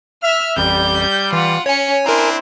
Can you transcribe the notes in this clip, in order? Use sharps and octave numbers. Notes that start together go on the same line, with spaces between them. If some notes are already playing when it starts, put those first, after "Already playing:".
E5 F6
A1 F2 G3 G6
E3 F4 F#5
C#4 C#5 G#5 C#7
C4 D4 E4 A#4 G#5 A#5 C6